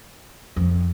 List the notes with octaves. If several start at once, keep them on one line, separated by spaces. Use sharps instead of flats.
F2